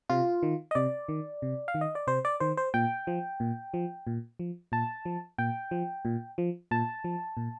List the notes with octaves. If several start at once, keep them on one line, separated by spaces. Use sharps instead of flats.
C3 F4
D#3
D#5
C3 D5
D#3
C3
F5
D#3
D#5
D5
C3 C5
D5
D#3 C5
C5
A#2 G5
F3
A#2
F3
A#2
F3
A#2 A5
F3
A#2 G5
F3
A#2
F3
A#2 A5
F3
A#2